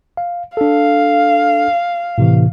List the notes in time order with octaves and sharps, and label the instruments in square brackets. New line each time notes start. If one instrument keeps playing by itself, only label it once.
[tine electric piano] F5
[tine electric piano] D4 A4 [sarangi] F5
[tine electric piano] A2 C3 E3